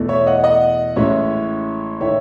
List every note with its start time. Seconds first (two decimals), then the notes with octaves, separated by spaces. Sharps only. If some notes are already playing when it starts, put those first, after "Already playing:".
Already playing: E2 B2 A3
0.08 C#5 E5
0.26 D#5 F#5
0.44 D#5 F#5
0.96 A1 A2 G#3 C#4 E4 C#5 E5
2.01 D#3 A3 E4 C#5 E5